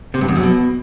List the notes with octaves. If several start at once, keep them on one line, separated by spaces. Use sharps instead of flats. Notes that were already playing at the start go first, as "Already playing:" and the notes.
C3
G2
E2
F#2
B2